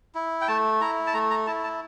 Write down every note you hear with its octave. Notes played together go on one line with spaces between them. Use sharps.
E4
G5
A3 A5
E4 A#5
A5
A3 A#5
A#5
E4 A5
A5